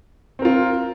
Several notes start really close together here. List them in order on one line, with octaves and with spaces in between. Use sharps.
C4 A#4 F4